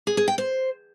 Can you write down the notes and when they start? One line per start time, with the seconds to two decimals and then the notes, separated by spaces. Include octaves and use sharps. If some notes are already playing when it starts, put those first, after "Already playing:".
0.07 G#4
0.17 G#4
0.28 G5
0.38 C5